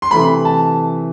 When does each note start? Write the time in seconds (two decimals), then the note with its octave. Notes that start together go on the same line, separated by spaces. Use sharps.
0.02 C6
0.11 C3 E3 A3 B5
0.45 A5